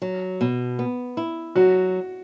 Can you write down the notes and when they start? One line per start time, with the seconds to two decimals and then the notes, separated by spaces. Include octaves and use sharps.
0.02 F#3
0.41 B2
0.79 B3
1.17 E4
1.56 F#3 F#4